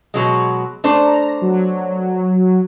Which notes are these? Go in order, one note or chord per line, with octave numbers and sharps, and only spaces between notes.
B2 F#3 G#3
A3 D4 C5
A#5
F#3